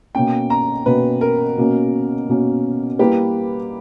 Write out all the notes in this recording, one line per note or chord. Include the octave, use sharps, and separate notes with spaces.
B2 A#3 C#4 G5
A#5
B2 A#3 C#4 B4
A#4
B2 A#3 C#4
B2 A#3 C#4
G3 A#3 E4 G4 B4